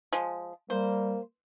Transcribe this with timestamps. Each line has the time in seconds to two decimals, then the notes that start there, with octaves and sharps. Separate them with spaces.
0.13 F3 G#3
0.70 G3 A#3 C5